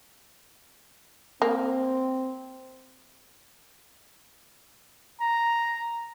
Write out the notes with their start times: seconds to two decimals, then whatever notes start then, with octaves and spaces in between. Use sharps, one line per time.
1.42 A#3 C4
5.21 A#5